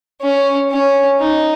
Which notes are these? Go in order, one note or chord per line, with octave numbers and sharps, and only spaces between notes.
C#4
C#4
D#4